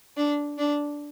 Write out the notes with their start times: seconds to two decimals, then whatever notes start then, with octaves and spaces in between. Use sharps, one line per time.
0.17 D4
0.58 D4